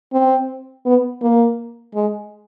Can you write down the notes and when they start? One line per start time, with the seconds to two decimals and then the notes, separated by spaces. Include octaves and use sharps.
0.13 C4
0.86 B3
1.22 A#3
1.95 G#3